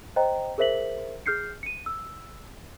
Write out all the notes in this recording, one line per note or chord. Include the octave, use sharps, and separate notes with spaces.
C5 D#5 G5 A#5
G#4 A#4 C5 E5 B6 F#7
G#4 F6 G6 C7 C#7
C#7 D#7
E6